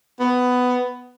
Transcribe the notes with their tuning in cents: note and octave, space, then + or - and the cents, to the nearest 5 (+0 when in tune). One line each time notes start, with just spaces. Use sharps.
B3 +10